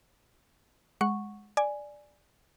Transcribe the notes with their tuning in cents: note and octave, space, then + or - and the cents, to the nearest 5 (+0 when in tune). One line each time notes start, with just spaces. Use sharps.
G#3 +0 F#5 -5 C#6 -5
D5 +5 G#5 +0